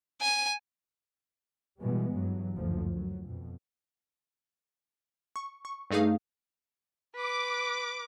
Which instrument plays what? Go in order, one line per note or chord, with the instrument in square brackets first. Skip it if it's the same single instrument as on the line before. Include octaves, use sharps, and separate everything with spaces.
[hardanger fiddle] G#5
[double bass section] B2 E3 G3 G#3 B3
G2 E3 F#3
F#1 D2 F3
F#2 F#3
F2 B2
[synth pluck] C#6
C#6
G2 A3 D#4 G#4 F5 D#6
[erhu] B4 [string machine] D6